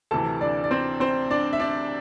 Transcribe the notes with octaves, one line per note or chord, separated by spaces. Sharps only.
D2 C3 E3 A4 A5
D4 D5
D5
C4 C5
C4 C5
D4 D5
E5
D4 D5